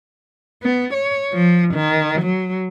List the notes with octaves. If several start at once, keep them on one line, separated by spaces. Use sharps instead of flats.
B3
C#5
F3
D#3
F#3